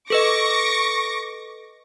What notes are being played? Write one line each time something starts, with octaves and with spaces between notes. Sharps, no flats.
A4 B4 D#5 C#6 D6 A#6